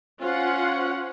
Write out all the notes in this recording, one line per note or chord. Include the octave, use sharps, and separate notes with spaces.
C#4 F4 C5 F5 F#5